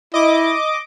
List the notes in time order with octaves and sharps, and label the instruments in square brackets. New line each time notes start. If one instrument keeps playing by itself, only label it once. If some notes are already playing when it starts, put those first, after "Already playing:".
[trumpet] E4 [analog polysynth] D#5 D6